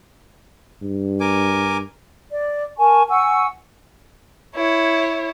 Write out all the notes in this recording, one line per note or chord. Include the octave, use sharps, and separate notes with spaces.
G2
A#4 G#5 D6
D5
A#4 G#5 A5 C#6
F#5 G#5 C#6 E6
E4 C#5